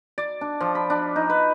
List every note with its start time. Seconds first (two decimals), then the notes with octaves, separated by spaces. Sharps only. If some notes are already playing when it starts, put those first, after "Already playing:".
0.18 D5
0.41 D4
0.61 F3
0.75 B5
0.90 D4
1.16 D#4
1.30 B4